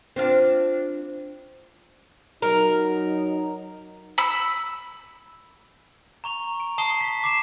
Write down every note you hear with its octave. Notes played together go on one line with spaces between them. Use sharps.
C4 D4 F4
F#3 D#4 A#4
B5 E6
A#5 C#6 F7
D7
A5 D#6 C7 G7
B6
D6 C7 E7